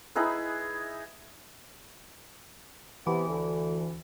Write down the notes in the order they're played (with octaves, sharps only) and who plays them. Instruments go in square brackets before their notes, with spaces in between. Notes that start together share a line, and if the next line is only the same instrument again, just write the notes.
[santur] D#4 E4 G#4 B4
[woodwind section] C3 B3 [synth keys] E3
[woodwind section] D2